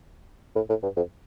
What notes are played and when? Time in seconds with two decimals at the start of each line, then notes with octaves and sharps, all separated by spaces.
0.56 A2
0.69 A2
0.83 G2
0.96 F2